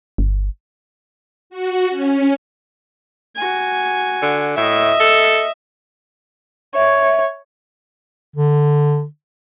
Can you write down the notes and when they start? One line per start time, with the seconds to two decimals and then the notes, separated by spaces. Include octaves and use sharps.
0.18 G1
1.50 F#4
1.90 C#4
3.36 F#4 G#5
4.22 D3
4.57 A2 D#5 E5
5.00 A4
6.75 C#5 E5
8.36 D3